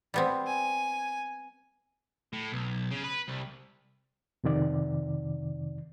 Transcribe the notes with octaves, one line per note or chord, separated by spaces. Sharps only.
G3 B3 C4
G#5
A2
B1
C#3
B4
C2
F2 C3 D#3 D5